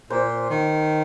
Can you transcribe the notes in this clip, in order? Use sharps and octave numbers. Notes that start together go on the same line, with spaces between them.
A#2 C5
D#3